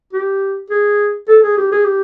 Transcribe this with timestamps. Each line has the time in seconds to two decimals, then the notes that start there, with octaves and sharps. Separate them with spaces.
0.13 G4
0.71 G#4
1.28 A4
1.43 G#4
1.58 G4
1.72 G#4
1.85 G4